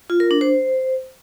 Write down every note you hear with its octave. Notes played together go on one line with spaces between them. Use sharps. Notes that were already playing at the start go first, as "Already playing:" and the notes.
F4
A#4
D4
C5